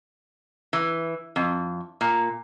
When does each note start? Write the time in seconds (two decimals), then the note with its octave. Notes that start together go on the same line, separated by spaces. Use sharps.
0.73 E3
1.36 F2
2.01 A#2